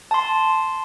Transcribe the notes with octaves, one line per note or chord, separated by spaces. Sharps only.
A5 C6